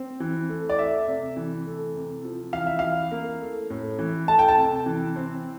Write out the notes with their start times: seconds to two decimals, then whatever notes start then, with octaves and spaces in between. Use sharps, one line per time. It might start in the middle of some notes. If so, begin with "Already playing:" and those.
Already playing: C4
0.20 E3
0.49 A3
0.69 D5
0.78 A3 E5
1.07 C3
1.37 E3
1.66 A3
1.95 C3
2.24 F3
2.53 E3 F5
2.67 E5
2.79 E3 F5
3.12 A#3
3.41 A3
3.70 A2
3.99 E3
4.28 A3 A5
4.39 G5
4.48 A5
4.58 C3
4.86 E3
5.16 C4